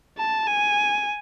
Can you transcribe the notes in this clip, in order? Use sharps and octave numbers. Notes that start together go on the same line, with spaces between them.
A5
G#5